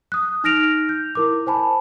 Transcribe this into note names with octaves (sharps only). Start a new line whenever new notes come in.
D#6 F#6
D#4 F6 A#6 D7 F7
G6
E4 A#4 D6
C5 G#5 A5 B5